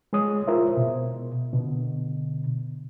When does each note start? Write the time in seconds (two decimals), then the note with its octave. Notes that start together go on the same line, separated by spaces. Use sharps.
0.13 G#3 G#4 C#5 D#6
0.47 E4 F4 A#4 C5 E5
0.77 B2
1.53 B2 D3